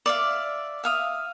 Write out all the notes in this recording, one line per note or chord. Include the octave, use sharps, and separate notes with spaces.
D5 E5 F5
E5 F5 D#6